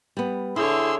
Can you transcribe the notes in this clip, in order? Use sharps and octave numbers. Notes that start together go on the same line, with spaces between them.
G3 B3
D3 E4 G#4 C#5 C6 E6